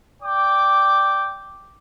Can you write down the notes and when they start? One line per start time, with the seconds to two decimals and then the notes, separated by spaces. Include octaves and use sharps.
0.23 D5 G5 D6